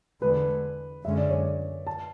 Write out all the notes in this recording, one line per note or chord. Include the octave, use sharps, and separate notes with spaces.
E2 D3 G#3 B4
F#2 D3 G#3 C#4 E5
D5
C#5
D5
A5